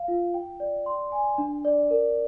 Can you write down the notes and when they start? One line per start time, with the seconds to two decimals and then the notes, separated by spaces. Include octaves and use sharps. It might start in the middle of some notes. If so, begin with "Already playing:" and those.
Already playing: F5
0.08 F4
0.34 G5
0.60 D5
0.86 C6
1.12 G#5
1.38 D4
1.65 D5
1.91 A#4